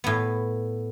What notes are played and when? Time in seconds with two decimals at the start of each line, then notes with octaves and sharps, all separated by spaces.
0.04 A2 B3